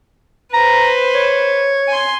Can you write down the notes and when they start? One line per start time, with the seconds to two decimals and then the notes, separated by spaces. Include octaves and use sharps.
0.54 B4 C5 A#5
1.14 C#5
1.88 G#5 C6